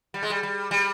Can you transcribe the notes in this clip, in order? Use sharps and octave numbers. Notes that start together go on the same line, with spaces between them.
G3
G#3
G3
G3
G3